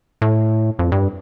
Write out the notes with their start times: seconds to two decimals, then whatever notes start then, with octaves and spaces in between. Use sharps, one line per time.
0.22 A2
0.79 F2
0.92 G2